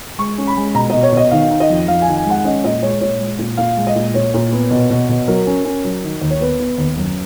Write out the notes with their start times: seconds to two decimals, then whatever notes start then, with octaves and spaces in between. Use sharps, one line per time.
0.18 G#3 C#6
0.38 C#4
0.47 B5
0.57 G#3
0.74 B2 A#5
0.90 B2 D#5
1.03 C#5
1.12 B2 D#5
1.31 D#3 F5
1.51 D#4
1.60 D#5
1.70 F2
1.88 F2 F5
2.02 G#5
2.08 D#3
2.16 G#5
2.25 G#3 F#5
2.44 C#4 D#5
2.64 A#2 D#5
2.82 G#3 C#5
3.01 A#2 C#5
3.20 G#3
3.39 A#2
3.57 A#2 F5
3.77 G#3
3.87 D#5
3.96 A#2
4.14 A#2 C#5
4.34 A#2
4.52 B3
4.71 B2
4.90 B2
5.09 B2
5.27 F#3 A#4
5.47 C#4
5.65 C#4
5.85 F#3
6.04 D#3
6.21 D#2
6.30 C#5
6.40 B3 B4
6.59 B3
6.78 D#2
6.98 F#2